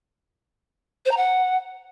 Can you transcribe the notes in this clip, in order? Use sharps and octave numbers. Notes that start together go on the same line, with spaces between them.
C5
A#5
F#5